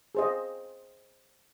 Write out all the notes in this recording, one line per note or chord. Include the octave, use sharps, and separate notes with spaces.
G#4 C5 D#5